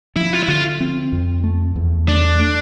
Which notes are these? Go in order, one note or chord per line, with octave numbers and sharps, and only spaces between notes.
F3 E4
F4
E4
D3 F4
C4
F2
A3
E2
A3 D4
A3